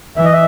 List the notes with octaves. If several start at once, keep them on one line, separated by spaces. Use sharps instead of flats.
E3 E5
D#5
E5